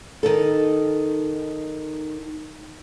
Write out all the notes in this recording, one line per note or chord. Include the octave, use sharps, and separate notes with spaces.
D#3 D#4 A4